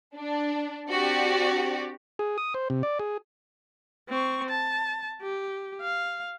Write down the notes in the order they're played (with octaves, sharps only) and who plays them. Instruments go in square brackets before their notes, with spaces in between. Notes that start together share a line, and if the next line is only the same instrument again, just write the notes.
[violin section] D4
C4 D4 F#4 G4 D5
[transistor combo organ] G#4
D#6
C5
C3
D5
G#4
[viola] C4 C#6
A5
G4
F5